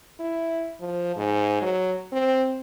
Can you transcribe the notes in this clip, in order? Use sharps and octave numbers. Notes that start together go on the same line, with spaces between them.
E4
F3
G#2
F#3
C4